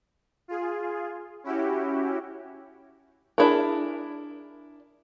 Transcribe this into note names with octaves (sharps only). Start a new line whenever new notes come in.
F4 G#4
C#4 E4 F#4 G4
D4 E4 G#4 A#4